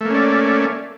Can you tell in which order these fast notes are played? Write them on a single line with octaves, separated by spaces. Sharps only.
A3 A#3 C#4 D5